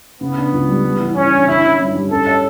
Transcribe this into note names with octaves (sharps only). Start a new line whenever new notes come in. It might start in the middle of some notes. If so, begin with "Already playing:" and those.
C#3 B3
D4
C#2
G3
G3
E3
E3 C#4
D4
D3 E4
C#4
G2
G3
C#4 A4
C#5